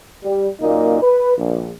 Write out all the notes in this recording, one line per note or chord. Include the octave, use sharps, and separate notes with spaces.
G3
F#2 A#2 A#3 D#4
B4
A#1